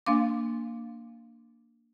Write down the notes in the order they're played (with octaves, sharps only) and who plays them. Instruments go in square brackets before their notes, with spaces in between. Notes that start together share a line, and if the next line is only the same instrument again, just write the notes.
[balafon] A#3 D4 F5 D6